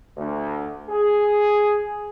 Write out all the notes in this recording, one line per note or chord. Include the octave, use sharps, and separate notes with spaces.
D2
G#4